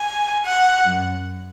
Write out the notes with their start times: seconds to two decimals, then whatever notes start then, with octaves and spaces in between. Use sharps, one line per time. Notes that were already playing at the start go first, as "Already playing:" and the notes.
Already playing: G#5
0.44 F#5
0.85 F#2